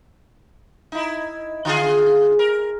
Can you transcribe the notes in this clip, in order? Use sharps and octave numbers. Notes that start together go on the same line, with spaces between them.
D#4 E4
D3 F4 G#4
A#4